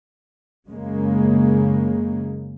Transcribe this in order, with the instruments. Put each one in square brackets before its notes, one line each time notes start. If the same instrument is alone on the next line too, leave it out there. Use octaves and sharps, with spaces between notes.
[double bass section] F#2 C#3 G#3 A#3